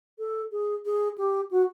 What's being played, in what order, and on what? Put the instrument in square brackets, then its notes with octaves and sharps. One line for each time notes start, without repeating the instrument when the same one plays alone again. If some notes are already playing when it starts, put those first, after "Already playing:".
[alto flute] A4
G#4
G#4
G4
F#4